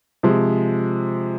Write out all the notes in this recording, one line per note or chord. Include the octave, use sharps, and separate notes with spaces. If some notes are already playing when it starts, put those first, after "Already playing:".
C3 F3 G#3